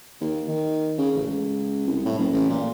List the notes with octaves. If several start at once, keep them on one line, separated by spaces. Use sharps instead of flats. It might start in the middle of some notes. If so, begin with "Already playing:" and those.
D#2
D#3
C#3
A1
C#2
C2
A2
F#1
A1
A#2